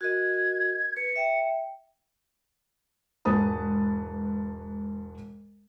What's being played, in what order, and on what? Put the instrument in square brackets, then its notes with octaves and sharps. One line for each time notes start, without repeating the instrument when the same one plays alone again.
[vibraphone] F#4 A#4 D#5 [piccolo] G#6
[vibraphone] B4 [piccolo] C#7
[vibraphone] E5 G5
[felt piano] E1 G#2 B4 A5 D#6